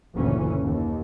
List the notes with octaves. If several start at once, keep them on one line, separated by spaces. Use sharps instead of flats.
F#1 D2 A#2 E3 C#4
D#2